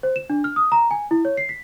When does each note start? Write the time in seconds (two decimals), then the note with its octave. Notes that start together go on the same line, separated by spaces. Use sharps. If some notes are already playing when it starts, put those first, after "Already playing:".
0.03 C5
0.16 E7
0.30 D4
0.44 F6
0.56 D#6
0.72 A#5
0.91 G#5
1.11 E4
1.25 C#5
1.37 C7
1.49 B6